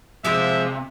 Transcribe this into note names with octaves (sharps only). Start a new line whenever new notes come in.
C3 F3 G#3 F4 E5